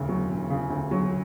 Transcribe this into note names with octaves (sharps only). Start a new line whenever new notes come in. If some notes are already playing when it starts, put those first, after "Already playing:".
Already playing: E1 D2 C#3
F#3
E1
C#3
D2
F#3